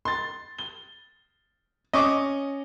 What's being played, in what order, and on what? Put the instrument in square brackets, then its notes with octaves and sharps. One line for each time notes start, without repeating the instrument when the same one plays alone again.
[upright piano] C6 A6
G7
[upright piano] C#4 [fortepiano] D#5 C#6 D6